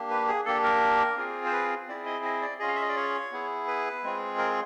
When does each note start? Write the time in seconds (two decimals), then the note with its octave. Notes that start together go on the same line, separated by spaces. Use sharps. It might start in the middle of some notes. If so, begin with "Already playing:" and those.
Already playing: A#3 D4 G4
0.10 B4
0.28 G#4
0.46 A#3 D4 G4 A4
0.63 A#4
1.17 C4 F4 G#4
1.46 C5
1.52 B4
1.88 C4 E4 G#4 D5
2.06 D#5
2.25 D#5
2.42 D5
2.59 C#4 F4 G#4 D#5
2.68 F5
2.75 E5
2.82 D#5
2.89 D5
2.96 C#5
3.32 B3 E4 G#4
3.68 B4
4.04 G#3 C4 F4 G#4
4.38 A#4